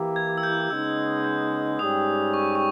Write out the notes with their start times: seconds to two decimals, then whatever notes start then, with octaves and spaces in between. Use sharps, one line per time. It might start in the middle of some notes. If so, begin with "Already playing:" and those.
Already playing: E3 A#3 E4 G4
0.16 G#6
0.38 E6
0.43 G6
0.70 C#3 G#3 B3 D#4 E6
1.24 G6
1.79 G#2 G3 C#4 G4 D#6
2.34 C#6
2.55 C#6